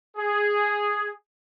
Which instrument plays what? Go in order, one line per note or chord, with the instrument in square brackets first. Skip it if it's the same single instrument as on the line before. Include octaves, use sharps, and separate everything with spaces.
[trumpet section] G#4